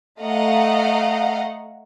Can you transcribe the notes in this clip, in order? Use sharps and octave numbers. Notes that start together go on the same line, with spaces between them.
A3 D#5 F5 F#5 A#5